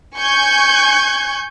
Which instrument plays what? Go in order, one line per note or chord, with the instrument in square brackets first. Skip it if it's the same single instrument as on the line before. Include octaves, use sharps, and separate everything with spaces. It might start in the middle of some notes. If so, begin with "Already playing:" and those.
[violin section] G#5 C#6 G6 G#6